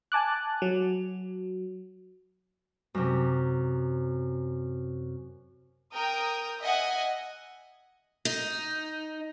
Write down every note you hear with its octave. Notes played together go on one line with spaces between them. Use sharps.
G#5 A5 D6 F#6
F#3
F#2 C3
A#4 G5 D#6
D#5 E5 F#5 G#5
D#4